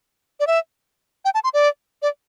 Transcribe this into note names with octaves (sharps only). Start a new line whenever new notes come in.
D5
E5
G5
A5
C6
D5
D5